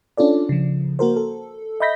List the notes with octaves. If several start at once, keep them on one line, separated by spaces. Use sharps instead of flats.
C#4 D4 F4 A4 D5
C#3 F3
A#3 F#4 A#4 C5
A4
D#5 E5 B5 G6 A#6 B6